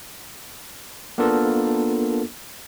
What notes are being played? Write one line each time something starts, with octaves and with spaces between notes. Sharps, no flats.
A#3 B3 D4 F4 A4 A#4